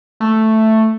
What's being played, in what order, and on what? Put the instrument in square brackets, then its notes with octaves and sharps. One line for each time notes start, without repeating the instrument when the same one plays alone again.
[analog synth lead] A3